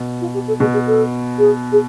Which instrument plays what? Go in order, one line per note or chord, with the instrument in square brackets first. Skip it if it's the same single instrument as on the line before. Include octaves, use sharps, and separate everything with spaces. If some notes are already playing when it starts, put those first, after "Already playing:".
Already playing: [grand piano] B2
[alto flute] F4
G4
A4
[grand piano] B2 [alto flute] G#4
[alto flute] G#4
A4
G#4
G#4